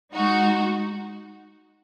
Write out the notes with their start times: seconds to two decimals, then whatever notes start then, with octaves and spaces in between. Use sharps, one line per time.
0.13 G#3 D#4 F#4